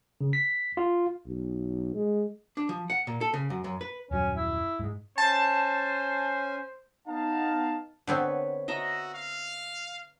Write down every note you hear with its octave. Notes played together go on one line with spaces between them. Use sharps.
C#3
B6
F4
B1
G#3
D4
F3
F#5
A#2
A4
C#3
F#2
F#2
B4
D#1 F#2 F#3 C#4
E4
G#2 G#3
C#4 C5 G#5 A5
B3 D#4 F5 A5
D3 B3 C4 B4 C#5
F#4 D#5 E5 A#5
F5